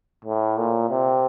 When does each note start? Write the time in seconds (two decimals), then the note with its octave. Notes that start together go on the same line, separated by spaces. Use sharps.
0.25 A2
0.58 A#2
0.90 C3